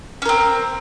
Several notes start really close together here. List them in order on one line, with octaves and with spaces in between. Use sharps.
C#4 A#4 C4